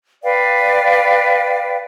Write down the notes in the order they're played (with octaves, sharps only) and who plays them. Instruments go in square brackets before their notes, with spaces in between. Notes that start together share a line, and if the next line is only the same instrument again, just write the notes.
[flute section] B4 D5 F5 G5